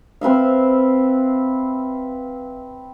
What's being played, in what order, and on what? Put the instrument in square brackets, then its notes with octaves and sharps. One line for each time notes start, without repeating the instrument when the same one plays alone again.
[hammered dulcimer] C4 B4 E5 F5